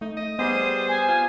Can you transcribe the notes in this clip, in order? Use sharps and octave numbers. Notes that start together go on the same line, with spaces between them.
A3 D#4
D#5
G3 B3 G#4 C5 C6 D#7
G#5
F4